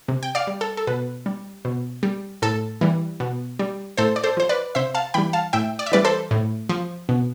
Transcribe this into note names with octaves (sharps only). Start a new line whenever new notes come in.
C3
G5
D5 F5
G3
A4
A4
B2 B4
G3
B2
G3
A2 A4
E3 G3
B2
G3
A2 A4 C5
D5
A4 C5
F3 C5
B4 D5
C3 C5 E5
F5 A5
E3 G3 G5 B5
F5 A5
A2 E5 G5
D5
E5
E3 G3 B4 D5
A4 C5
A2
F3
B2